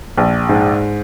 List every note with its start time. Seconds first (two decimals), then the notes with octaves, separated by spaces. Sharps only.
0.17 A#1
0.49 G#2